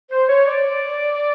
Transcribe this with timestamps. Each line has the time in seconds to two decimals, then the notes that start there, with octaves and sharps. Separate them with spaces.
0.11 C5
0.29 C#5
0.46 D5